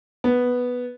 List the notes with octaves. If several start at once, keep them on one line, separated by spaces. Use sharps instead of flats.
B3